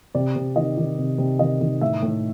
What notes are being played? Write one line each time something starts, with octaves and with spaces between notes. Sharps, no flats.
C3 D5
C3
D#3 D#5
D#3
C3
C3
D#3 D#5
D#3
A2 E5
A2